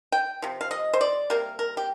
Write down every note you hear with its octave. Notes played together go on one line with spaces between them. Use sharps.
G5
C3 F3
F5
D#5
C5
D5
C3 G3 A#3 A#4
A#4
G4